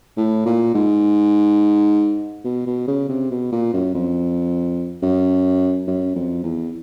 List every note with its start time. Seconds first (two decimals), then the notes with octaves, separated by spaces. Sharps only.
0.17 A2
0.46 A#2
0.75 G#2
2.45 B2
2.66 B2
2.88 C#3
3.09 C3
3.31 B2
3.52 A#2
3.73 F#2
3.94 F2
5.02 F#2
5.87 F#2
6.16 F2
6.44 E2